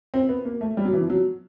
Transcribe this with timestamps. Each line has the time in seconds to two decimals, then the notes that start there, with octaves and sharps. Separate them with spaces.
0.14 C4
0.29 B3
0.45 A#3
0.61 A3
0.77 G3
0.85 F#3
0.93 E3
1.01 F3
1.10 F#3